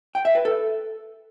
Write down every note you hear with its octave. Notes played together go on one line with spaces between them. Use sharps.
G5
E5
B4
A4